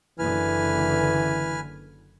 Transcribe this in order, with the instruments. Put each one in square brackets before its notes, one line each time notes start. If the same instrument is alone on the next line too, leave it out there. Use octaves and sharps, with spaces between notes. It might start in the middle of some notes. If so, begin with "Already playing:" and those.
[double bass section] F#1 F#2 D3 [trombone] E3 [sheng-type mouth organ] B4 G#5 F6